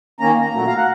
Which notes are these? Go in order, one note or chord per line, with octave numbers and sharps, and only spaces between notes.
D#3 A#3 C#4 A#5
A#5
A#2 F#3 A3
F5
F#5